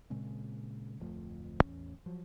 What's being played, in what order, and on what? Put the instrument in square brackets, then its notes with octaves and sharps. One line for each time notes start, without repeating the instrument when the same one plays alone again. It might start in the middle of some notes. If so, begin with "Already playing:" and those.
[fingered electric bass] A#2 C#3 G#3 C4
D1 F2 F3 A3
A1 E2 C#4
F3 F#3